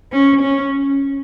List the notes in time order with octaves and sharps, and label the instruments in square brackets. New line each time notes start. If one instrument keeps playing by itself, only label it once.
[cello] C#4
C#4